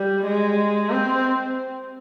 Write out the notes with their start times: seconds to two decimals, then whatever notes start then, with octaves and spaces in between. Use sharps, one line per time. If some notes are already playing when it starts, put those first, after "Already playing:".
Already playing: G3
0.27 G#3
0.91 C4